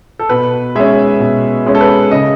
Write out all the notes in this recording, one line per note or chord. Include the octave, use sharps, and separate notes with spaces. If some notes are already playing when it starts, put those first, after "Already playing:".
A4
B2 B4
G#3 C#4 E5
B2
G#3 C#4
A4
B4
C#3 D#5